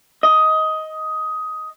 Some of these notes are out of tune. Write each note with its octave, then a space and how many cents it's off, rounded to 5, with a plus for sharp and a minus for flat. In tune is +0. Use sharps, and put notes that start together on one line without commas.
D#5 +15